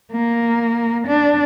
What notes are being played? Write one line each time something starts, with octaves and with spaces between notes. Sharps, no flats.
A#3
D4